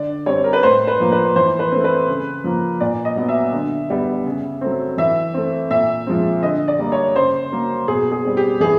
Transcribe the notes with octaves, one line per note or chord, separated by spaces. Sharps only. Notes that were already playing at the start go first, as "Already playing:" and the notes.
Already playing: D3 D5
G3 C4 C#5
A#4
B4
A2 C5
B4
F3 A#3
B4
E3 C5
B4
A3 C4
B4
C#3
F3 A#3
A#2 D5
D#5
F#3 B3
E5
D3
G3 B3
C#3
F#3 A3 C4
E3 E5
A3 C4
A#2 E5
F3 G#3 C4
D3 D#5
D5
G3 A#3
C#5
C#3 C5
F#3 A#3
B2 G#4
G#4
G3 C4
G4
E3 G#4